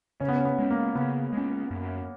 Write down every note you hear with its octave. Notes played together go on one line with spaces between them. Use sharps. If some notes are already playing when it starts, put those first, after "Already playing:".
C#3 C#4
B3
C#4
B3
G#3 C#4
A#3
C#3 B3
G#3 C#4
F#2